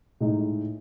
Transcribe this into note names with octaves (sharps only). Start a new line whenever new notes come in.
A2 G#3 D#4